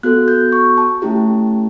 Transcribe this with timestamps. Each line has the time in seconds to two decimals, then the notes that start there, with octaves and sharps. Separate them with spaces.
0.03 B3 F#4 A4 F#6
0.28 G6
0.52 C#6
0.78 A5
1.02 A3 C#4 E4 G4